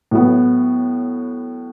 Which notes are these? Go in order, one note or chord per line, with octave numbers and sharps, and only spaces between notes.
A2 F#3 B3